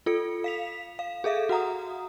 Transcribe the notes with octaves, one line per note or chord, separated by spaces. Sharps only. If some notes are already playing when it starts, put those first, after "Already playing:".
F4 A4 C#7
F5 B6 F7
F5
G#4 A4 E5 F5
F#4 F#5 A#5 D#6